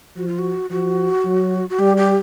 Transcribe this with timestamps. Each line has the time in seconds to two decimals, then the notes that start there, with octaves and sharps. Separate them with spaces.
0.17 F3 F#4
0.28 F4
0.39 F#4
0.70 F3 F#4
1.25 F#3
1.70 F#4
1.79 G3 G4
1.97 G4